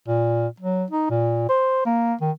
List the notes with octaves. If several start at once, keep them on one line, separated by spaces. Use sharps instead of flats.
A#2
F#3
D#4
A#2
C5
A#3
D#3